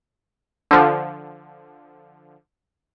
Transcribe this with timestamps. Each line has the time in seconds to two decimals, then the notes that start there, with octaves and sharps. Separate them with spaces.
0.71 D3 F3